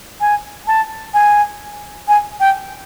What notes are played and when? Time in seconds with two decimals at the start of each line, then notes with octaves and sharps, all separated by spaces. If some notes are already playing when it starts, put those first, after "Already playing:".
0.21 G#5
0.67 A5
1.14 G#5
2.08 G#5
2.40 G5